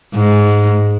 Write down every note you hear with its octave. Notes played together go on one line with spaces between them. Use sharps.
G#2